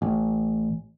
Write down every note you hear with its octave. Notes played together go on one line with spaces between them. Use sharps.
A1